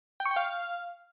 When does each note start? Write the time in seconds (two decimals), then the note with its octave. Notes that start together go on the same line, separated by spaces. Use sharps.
0.20 G5
0.26 C#6
0.31 G5
0.36 F5